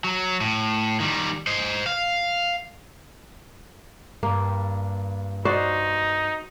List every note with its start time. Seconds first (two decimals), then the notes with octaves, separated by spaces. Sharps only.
0.04 F#3
0.41 A2
1.00 D#3 G3
1.47 C5 D#5
1.86 F5
4.23 G2 A#3
5.45 D#4 F#4 C5 D5